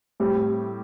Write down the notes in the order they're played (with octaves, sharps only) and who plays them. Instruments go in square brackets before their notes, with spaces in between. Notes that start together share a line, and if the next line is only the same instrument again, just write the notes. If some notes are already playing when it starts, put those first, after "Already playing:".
[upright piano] A2 G3 C4 G4